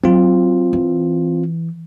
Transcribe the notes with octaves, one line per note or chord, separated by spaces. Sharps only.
F#3 C4 F4
E3